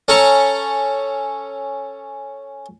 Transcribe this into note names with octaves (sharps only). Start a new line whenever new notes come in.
C#4 A4 A#5 C#6